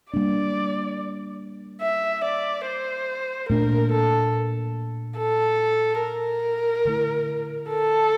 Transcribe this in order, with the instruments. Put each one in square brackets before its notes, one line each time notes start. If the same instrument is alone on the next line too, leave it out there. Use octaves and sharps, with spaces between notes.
[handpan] G3 A#3 D4 [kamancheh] D5
[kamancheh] E5
D5
C5
[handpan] A#2 A3 D4 [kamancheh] A#4
[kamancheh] A4
A4
A#4
[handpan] D3 A3 E4
[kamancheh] A4